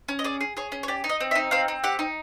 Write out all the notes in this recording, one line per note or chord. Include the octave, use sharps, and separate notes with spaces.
C#4
D#5
G#4 D5
G#4
G#4 C#5
C#4
C#5
G4 D5
D#4
D#5
C4
E5
D#4
C4 F5
C4
G4 F#5
D#4